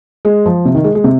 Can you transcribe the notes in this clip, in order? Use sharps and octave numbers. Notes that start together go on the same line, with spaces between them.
G#3
F3
C3
D#3
G#3
G#3
C3